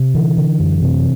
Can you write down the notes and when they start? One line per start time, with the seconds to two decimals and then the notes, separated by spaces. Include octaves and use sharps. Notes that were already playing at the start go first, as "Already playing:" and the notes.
Already playing: C3
0.15 D3 E3
0.38 D3
0.60 F#2
0.82 C3